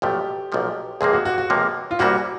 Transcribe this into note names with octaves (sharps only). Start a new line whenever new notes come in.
B1 A#2 F3 A3 G4
B1 A#2 F3 A3
C#2 C3 F3 A#3 G#4
F#4
F#4
F#4
C#2 C3 F3 A#3
F4
C2 A#2 G3 A#3 C#4 F#4